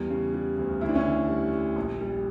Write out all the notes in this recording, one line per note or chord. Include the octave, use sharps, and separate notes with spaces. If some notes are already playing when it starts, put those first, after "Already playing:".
Already playing: E2 G3
C#3
G3
D2
D2 E4
D4
C#4 E4
D3
G3
G3
A#1
G3